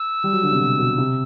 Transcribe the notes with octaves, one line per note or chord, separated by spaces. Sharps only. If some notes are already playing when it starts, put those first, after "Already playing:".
Already playing: E6
G3
F#3
D3
C3
B2
B2
C3